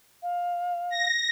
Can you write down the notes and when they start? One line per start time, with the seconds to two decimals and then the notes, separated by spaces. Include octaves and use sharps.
0.22 F5
0.90 A#6